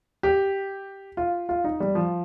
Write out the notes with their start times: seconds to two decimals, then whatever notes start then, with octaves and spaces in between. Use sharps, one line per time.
0.23 G4
1.17 F4
1.49 F4
1.64 D#4
1.80 G3
1.95 F3